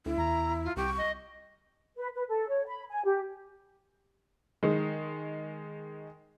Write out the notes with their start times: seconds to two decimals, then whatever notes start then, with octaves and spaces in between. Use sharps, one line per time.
0.06 D2 E4
0.18 E2 A#5
0.65 F4
0.77 C2 G4 C#6
0.97 D#5
1.96 B4
2.14 B4
2.28 A4
2.48 C#5
2.67 B5
2.90 G#5
3.04 G4
4.63 D#3 G#3